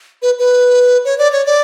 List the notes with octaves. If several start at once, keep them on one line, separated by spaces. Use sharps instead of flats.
B4
B4
C#5
D5
C#5
D5